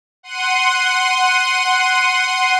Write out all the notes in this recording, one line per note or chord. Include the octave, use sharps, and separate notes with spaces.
F#5 C6 D#7